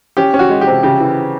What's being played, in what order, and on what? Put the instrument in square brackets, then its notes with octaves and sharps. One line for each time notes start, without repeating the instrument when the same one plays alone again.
[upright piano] C#4 [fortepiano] G4
[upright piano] C#4
[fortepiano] F#4
[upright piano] G#3
[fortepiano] G4
[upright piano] C3
[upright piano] C#3 [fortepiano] G4
[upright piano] E3